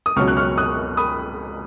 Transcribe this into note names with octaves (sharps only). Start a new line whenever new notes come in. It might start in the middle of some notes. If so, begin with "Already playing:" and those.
D#6
C#2 B2 F#3 C#4 C#6 F6
F#6
C#6 F6
D#6 F#6
B5 D#6